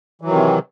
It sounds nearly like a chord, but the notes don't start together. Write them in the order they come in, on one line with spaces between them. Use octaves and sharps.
E3 F#3 D#3 C3